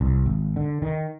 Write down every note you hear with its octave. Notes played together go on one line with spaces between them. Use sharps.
C2
G#1
D3
D#3